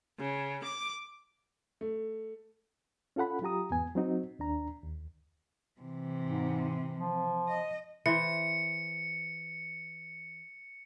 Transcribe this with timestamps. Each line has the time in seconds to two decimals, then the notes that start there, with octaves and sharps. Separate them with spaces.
0.19 C#3
0.64 D6
1.81 A3
3.16 C#4 F4 A4 F#5 B5
3.42 F#3 F4 G4 A#5 D#6
3.71 E2 G#2 B3 G#5
3.95 F#3 C4 D#4 F#4
4.39 D#2 D4 A#5
4.83 D#2
5.80 C3 E3
6.23 G#2
6.97 F3
7.48 D#5
8.06 E3 C5 C#7